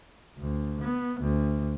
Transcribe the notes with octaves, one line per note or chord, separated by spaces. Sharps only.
D2
B3
D2